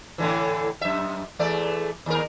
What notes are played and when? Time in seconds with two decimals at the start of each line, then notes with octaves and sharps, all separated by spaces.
0.18 A2 D3 E3
0.81 F#2 E5
1.39 E2 A3 D5
2.06 D#2 A#4